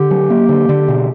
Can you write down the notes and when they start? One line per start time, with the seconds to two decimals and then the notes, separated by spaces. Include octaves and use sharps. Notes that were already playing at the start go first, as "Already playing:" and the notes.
Already playing: D3 G4
0.11 F#3
0.30 A#3
0.49 D3
0.69 D3
0.88 B2